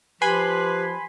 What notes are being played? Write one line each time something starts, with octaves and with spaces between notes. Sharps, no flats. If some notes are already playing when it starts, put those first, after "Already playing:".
F3 G4 B4 G#5 B5 C6